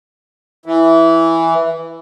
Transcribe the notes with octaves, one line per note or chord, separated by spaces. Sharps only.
E3